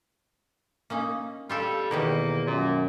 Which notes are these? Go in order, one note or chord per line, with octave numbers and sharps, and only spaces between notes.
A#3 C#4 D#4
G3 F4 G4 A4
E2 B2 D#3 A#3 G4
F#2 A#2